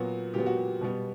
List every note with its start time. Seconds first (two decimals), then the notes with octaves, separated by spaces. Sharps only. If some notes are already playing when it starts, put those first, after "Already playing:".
Already playing: A#2 F#3 B3 F#4
0.34 A#2 F#3 B3 G4
0.46 F#4
0.57 G4
0.81 B2 G3 B3